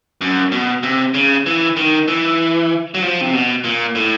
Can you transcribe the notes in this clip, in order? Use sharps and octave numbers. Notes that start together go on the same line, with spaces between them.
F#2
B2
C3
C#3
E3
D#3
E3
F#3
F3
C3
B2
A#2
A2